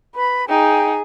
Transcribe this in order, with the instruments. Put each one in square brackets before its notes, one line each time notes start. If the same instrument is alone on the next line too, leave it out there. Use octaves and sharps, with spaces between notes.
[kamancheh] B4 [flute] B5
[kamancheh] D#4 G#4 [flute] G5